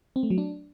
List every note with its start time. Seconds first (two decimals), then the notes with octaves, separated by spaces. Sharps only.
0.16 C4
0.23 A3
0.30 F#3
0.38 D4